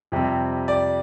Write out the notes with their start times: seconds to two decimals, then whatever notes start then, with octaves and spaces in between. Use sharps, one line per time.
0.12 F2 C3 G3 C4
0.68 D5